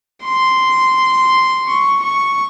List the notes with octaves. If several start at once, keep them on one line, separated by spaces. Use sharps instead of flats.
C6
C#6
C#6